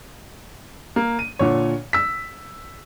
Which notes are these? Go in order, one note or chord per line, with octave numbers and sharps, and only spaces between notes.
A#3
D#7
A#2 D3 C#5
E6 B6